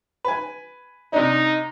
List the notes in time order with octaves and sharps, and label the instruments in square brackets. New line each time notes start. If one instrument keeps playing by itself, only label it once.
[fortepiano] B4 G#5
[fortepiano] C3 D4 [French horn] D#4